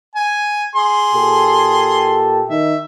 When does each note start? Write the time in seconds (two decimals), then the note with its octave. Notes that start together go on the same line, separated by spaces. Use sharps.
0.15 G#5
0.75 G#4 C6
1.14 A#2 G4 A4
2.49 D#3 E5